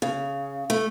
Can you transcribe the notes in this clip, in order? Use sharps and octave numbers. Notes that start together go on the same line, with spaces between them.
C#3
A3